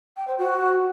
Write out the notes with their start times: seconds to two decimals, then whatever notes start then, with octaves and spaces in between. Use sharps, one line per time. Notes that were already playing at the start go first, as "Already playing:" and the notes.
0.17 G5
0.27 C5
0.38 F#4